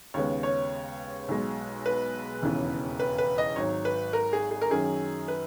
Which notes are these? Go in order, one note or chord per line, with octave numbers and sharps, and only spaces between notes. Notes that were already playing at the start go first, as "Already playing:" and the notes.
D#2 C#3 G#3 B3 C#5
C#5
B1 B2 G#3
B4
E1 D#2 C#3 E3 B3
B4
B4
D#5
G#1 G#2 F#3 C#5
B4
A#4
G#4
G#4
A#4
F#2 D#3 F#3 C#4 G#4
B4